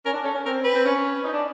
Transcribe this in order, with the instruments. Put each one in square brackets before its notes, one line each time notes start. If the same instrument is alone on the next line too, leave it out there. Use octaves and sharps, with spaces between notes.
[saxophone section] C#4 [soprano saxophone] A#4
[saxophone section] D4
[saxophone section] C#4 [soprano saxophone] A4
[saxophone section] C#4
[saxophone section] C4 [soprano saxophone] A#4
[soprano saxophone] B4
[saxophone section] C4
C#4
D#4
D4